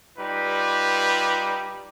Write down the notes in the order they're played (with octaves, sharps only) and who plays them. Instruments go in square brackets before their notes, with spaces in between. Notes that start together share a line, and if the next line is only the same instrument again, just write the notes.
[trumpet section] G3 D#4 F4 B4